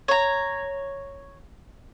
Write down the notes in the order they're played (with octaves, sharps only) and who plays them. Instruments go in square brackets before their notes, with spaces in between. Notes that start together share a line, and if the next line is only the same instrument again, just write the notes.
[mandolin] C#5 A#5